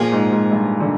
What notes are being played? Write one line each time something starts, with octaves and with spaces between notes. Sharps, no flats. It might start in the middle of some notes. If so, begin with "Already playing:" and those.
Already playing: A#2 F3 A#3 F4 G#4
G#2
G#2
G2
D3